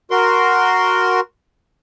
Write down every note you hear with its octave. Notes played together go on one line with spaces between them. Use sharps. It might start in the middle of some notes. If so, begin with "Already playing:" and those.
F#4 A#4 C6